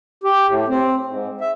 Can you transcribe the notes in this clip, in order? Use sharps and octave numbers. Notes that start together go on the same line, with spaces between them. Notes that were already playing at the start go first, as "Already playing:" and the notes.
G4
A2
C4
G#2
E5